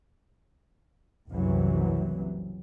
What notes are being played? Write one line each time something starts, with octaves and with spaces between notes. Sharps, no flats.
F#1 C2 F#2 C3 E3 F#3